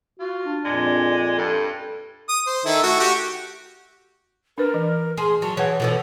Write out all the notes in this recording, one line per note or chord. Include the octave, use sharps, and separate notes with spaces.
F4 F#4
D4
F2 A#2 G#3 D5
G2 A4
D#6
C5
D#3 E4 A4
A3 F#4
F#4 G4
D4 A#4 B4
E3
G#4 C6
F#3 A5
E3 G#4 C#5 F#5
B2 E3 F3 A4